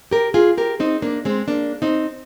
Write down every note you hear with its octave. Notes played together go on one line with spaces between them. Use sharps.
G4 A#4
F4 G#4
G4 A#4
C4 D#4
A#3 D4
G#3 C4
A#3 D4
C4 D#4